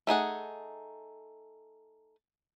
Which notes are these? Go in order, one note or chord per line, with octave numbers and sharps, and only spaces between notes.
A3 D#4 G#4 F#5